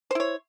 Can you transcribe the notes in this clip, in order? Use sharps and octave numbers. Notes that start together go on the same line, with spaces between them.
E4 C5 C#5